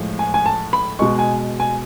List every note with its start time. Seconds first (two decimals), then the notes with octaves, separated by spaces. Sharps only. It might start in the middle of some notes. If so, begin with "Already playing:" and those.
Already playing: A2 F3 G#3
0.19 G#5
0.34 G#5
0.46 A5
0.73 B5
0.99 B2 G#3 C#6
1.19 G#5
1.60 G#5